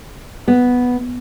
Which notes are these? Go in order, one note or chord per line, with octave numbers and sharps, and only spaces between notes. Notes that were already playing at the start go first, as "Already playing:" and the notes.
B3